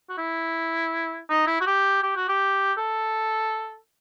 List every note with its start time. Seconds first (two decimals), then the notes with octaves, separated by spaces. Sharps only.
0.10 F#4
0.18 E4
1.30 D#4
1.47 E4
1.61 F#4
1.66 G4
2.03 G4
2.16 F#4
2.29 G4
2.78 A4